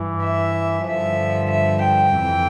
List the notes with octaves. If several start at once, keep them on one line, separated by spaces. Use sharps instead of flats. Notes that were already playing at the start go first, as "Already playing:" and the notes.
Already playing: G2 E3
E5
G2 D3 F3 E5
E5
G5
F2 C3 E3